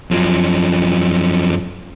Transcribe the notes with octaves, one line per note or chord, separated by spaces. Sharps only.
F#2 F3